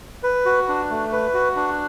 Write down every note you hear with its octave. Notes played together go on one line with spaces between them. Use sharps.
B4
F#4
D4
A3
B4
F#4
D4